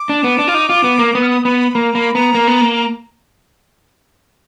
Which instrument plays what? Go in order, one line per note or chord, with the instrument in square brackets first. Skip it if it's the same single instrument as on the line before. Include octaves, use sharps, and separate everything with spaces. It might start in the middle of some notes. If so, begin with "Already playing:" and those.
Already playing: [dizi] D6
[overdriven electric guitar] D4
B3
D4
F4
D#4
F4
B3
A#3
[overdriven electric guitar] B3 [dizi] D#6
[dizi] F6
D#6
[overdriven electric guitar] B3 [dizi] B5
[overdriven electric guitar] A#3 [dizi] A#5
[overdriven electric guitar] A#3 [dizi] B5
[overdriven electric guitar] B3 [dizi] A#5
[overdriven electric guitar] A#3
B3
A#3